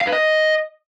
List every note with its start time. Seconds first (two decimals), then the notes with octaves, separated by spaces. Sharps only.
0.01 F5
0.07 B4
0.12 D#5